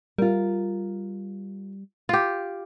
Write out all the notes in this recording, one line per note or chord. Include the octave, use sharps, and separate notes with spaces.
G3 F4 A#4
F4 G4